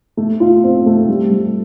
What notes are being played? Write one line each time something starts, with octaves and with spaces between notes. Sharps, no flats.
A3
F4
C4
A3
G3
G3